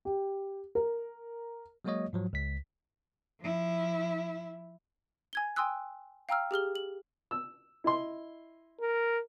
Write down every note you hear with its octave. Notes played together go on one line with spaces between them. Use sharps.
G4
A#4
F#3 G#3 A#3 F#4 C#5 D#5
G#2 F3 F#3
C#2 B6
F3 E4
G#5 G#6 G7
G5 G#5 C6 D#6 E6 F#6
F5 G5 A#5 E6 F6
G4 G#4 F6 G7
F#7
E6
E4 D#5 C6
A#4